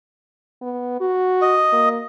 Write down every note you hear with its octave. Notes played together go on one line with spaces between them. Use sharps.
B3
F#4
D#5
A#3